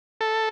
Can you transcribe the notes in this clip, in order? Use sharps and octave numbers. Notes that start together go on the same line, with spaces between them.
A4